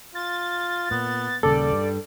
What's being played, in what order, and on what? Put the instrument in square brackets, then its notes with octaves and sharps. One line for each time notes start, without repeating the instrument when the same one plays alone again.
[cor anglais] F4 [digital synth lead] A6
[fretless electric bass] A#2 [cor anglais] B3
[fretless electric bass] D#1 C#3 A#3 [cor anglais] G3 [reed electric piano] A4 [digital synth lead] D5
[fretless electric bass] G2